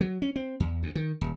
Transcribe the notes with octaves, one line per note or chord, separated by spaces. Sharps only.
F#3
C#4
C4
E2
D2
D#3
D#1